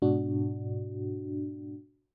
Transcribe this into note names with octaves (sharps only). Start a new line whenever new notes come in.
G#2 B2 D4 F#4